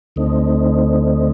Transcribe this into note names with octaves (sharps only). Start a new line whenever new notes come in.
D2 D3 A3 C4 D#4